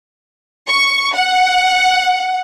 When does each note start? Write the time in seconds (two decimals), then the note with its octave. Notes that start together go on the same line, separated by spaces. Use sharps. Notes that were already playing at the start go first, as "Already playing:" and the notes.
0.68 C#6
1.15 F#5